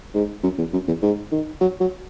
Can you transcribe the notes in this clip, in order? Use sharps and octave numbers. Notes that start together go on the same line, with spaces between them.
G#2
F#2
E2
F#2
E2
G#2
D#3
F#3
F#3